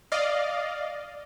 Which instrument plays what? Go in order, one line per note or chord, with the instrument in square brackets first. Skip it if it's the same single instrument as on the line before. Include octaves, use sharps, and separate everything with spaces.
[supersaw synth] D5 D#5 F5